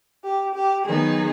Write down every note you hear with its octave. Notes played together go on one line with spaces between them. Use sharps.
G4
G4
D#3 F#3 B3 D#4 G#4